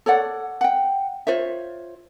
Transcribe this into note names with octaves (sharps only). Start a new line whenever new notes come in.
A4 C#5 D5 F#5
F#5 G5
F4 C5 C#5 E5